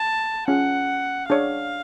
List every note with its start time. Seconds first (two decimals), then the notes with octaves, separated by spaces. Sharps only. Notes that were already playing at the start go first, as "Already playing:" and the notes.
Already playing: A5
0.47 C#4 F4 G#4 F#5
1.29 D4 G#4 C#5 F5